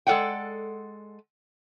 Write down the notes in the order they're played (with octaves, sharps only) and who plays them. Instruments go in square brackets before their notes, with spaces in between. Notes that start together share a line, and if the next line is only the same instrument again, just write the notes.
[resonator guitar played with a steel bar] G#3 A4 B4 D5 F#5 G5